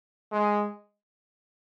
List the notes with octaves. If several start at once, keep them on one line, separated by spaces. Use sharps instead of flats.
G#3